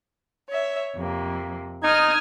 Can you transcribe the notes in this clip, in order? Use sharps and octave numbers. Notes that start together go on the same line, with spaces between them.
C#5 E5
F2 C3 A#3
D#4 D#6 F6 G#6